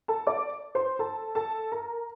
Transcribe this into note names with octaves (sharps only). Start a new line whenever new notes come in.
A4 A5
D5 D6
C5 C6
A4 A5
A4 A5
A#4 A#5